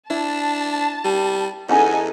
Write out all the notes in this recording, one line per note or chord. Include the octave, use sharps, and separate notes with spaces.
D4 E4 A5
G3
E2 C#4 D#4 A4 F#5 G#5